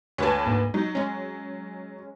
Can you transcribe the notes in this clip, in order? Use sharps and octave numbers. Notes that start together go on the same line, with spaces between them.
D2 B4 C#5 G#5 A5
G#2 A#3
F#3 D#4
G#3 C#4